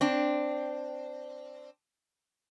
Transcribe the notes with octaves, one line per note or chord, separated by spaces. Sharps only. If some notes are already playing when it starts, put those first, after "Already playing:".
C4 D4